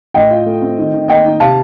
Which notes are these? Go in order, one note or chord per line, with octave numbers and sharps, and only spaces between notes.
A2 D#5 G5
F4
A3
C4
D#3
D#3
A#3 D#5 G5
D#4
C3 F5 A5